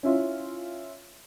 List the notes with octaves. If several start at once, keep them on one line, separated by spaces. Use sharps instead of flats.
C#4 E4 F4